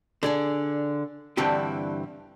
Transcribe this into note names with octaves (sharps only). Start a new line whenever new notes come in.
D3 G#4 D5
G2 D3 E3 C4 G4